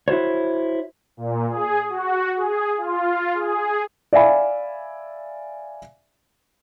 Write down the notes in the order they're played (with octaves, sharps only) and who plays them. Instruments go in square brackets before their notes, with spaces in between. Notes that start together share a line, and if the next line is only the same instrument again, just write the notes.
[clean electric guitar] E4 F#4 C5 C#5
[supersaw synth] A#2
G#4
F#4
G#4
F4
G#4
[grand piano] D5 E5 F5 G#5 B5